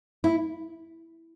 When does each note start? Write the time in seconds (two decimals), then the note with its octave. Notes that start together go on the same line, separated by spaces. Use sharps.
0.24 E4